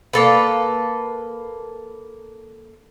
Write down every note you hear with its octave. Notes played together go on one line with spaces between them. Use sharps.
A#3 A4 B4